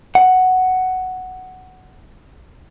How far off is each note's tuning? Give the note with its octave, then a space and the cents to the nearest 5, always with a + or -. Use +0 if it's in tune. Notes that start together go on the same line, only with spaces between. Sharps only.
F#5 +5